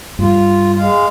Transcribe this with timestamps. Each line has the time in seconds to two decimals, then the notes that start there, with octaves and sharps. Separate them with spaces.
0.19 G2 G3 F4
0.77 G#3 F5